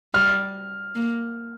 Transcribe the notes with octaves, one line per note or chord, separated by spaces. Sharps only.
G3 F6
A#3